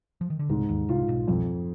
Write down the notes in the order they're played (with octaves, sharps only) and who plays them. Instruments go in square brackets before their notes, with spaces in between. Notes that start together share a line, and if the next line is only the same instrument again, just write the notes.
[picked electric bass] F3
D#3
D3
[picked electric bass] C2 C3 [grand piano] G#2
[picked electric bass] D#2 D#3
[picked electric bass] C2 C3 [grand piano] F4
[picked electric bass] B1 B2
[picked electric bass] B1 B2 [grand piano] F2